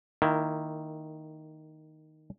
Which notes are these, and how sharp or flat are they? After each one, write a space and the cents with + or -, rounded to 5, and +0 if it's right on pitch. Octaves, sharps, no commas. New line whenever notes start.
D#3 +0 A#3 -20 E4 +10